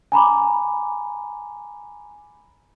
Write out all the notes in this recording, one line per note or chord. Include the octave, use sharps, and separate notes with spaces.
G#5 A#5 B5 D6